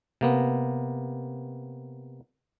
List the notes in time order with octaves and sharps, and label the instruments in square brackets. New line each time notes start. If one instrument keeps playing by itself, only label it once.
[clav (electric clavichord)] C3 A#3 B3